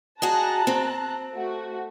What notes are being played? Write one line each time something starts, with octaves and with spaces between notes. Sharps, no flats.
F#4 G#4 D#5 A5 A#5 F#6
C4
A3 F#4